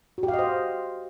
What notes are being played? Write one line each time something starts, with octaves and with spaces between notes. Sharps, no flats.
F#4
G4
F5
D#5
C5